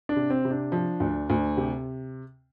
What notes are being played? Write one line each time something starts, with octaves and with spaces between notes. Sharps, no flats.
D4
C3
C4
C3
D4
F3
D2
D2
C3 G4